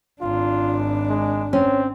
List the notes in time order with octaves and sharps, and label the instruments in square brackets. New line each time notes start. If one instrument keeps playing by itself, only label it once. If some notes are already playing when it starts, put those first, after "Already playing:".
[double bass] G#1 D4 [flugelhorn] F4
[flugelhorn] G#3
[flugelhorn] C4 [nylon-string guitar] C#4